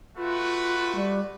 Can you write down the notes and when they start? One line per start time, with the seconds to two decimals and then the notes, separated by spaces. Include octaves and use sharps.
0.17 A3 F4 F#4 B4
0.95 G3